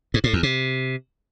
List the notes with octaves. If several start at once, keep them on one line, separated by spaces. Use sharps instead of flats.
G#2
A2
E2
C3